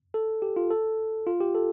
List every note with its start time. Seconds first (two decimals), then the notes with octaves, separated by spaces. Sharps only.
0.14 A4
0.42 G4
0.56 F4
0.70 A4
1.27 F4
1.41 G4
1.55 A4